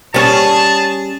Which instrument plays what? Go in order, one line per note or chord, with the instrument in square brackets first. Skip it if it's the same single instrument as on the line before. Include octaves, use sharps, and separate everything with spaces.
[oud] G3 C#4 [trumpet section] G#4 A5